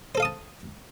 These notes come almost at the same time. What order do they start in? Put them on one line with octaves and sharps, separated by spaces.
C5 A4 F5 D#6 A5